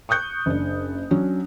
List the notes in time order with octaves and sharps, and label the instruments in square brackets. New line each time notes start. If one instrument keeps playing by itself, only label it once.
[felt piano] C#6 D#6 F#6 G6 C#7
F#1 D4
F#3 C#4 D4